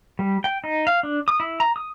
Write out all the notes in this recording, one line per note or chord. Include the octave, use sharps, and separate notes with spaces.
G3
G5
D#4
F5
D4
D#6
E4
A#5
D#6